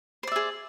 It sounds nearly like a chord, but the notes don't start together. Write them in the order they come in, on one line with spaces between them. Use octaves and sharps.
C5 D5 E5 G#4